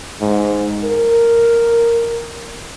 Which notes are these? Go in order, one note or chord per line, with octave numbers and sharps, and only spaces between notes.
G#2
A#4